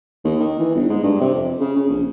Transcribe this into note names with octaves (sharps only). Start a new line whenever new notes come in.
D#2
D#3
E3
G1
G#2
G2
C3
F2
C#3
C#3
A#1